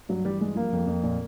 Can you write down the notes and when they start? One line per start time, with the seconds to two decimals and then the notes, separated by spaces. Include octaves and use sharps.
0.09 G2 F#3
0.25 E3 G3
0.41 G2 G#3
0.56 F3 A#3
0.73 F2
0.87 F2
1.03 A#2